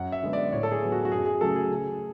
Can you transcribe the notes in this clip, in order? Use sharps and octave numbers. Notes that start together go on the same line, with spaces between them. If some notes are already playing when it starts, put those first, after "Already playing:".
Already playing: F#2 F#5
E5
D3 G#3 B3
D5
A2 C#5
A4
G#4
F#3 B3
F#4
F#4
F#2 G#4
G#4
C#3 F#3 A3 A4
G#4
C#3